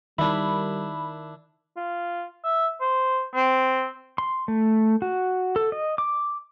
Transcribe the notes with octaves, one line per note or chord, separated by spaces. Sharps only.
D#3 G3 D4 E4 B5
F4
E5
C5
C4
C6
A3
F#4
A4
D#5
D6